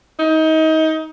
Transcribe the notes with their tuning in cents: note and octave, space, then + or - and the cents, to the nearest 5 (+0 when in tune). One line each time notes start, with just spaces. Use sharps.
D#4 +30